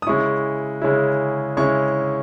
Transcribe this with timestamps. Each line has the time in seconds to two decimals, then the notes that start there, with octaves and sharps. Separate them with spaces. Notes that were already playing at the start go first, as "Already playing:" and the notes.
0.02 D#6
0.07 C#3 G#3 C#4 E4 C#6
0.82 C#3 G#3 C#4 E4
1.57 C#3 G#3 C#4 E4 C#6